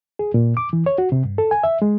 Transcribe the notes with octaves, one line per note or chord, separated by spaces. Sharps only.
G#4
A#2
D6
E3
C#5
F#4
C3
G2
A4
G#5
E5
G#3